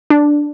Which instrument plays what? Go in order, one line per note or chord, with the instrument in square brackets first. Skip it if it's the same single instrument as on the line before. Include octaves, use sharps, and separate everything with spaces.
[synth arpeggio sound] D4